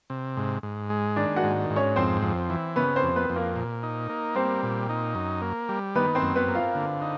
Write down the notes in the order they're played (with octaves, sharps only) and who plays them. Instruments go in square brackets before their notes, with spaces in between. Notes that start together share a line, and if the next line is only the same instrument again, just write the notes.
[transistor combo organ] C3
G#2
G#2
G#3
[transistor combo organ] D#3 [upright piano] D4 D5
[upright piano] F#4 F#5
[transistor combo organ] G#2
G#2
[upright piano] C#4 C#5
[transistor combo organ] F2 [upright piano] C4 C5
[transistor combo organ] F2
E3
[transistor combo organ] C#3 [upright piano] B3 B4
[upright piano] C4 C5
[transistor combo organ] F2
[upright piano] B3 B4
[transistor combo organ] F2
[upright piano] A#3 A#4
[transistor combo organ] A#2
D#4
A#3
[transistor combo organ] G3 [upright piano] C4 C5
[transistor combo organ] A#2
D#4
F#2
A#3
G3
[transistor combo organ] D#3 [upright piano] B3 B4
[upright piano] C4 C5
[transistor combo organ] F#2
[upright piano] B3 B4
[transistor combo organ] A#3
[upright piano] F4 F5
[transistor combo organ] D3
D#4